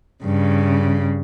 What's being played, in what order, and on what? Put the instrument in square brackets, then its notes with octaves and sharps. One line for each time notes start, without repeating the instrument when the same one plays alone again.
[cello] G2 C#3